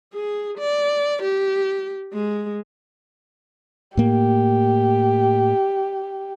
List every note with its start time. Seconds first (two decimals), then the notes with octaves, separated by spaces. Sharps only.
0.14 G#4
0.58 D5
1.23 G4
2.14 G#3
3.97 A2 A#3 G4